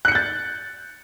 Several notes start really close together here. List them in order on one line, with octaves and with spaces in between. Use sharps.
F#6 C#7 G6 A6